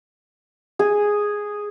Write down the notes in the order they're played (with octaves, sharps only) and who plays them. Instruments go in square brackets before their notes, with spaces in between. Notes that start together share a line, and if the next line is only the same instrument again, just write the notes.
[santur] G#4